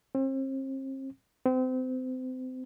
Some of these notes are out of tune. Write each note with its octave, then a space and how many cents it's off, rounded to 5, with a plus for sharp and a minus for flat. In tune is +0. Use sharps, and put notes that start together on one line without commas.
C4 +40
C4 -30